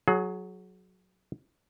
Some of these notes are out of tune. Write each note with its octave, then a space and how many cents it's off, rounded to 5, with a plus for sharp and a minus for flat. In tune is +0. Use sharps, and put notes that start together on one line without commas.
F#3 -5 G#4 +25